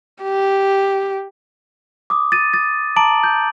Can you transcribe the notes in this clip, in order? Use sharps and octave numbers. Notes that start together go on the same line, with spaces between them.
G4
D6 D#6
A6 D#7
D#6 A6
A5 A#5 D6 D7 F#7
G6